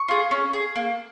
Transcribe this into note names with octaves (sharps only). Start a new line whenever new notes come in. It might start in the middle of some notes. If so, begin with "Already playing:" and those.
Already playing: C#6
F4 G#4
C#4
G#4
A#3